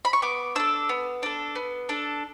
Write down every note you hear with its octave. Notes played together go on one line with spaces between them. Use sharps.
B5
C#6
B3 D6
D4 A4 E6
B3
D4 A4
B3
D4 A4